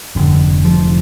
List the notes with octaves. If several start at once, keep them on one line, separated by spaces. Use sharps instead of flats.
F1 F2 D3
F3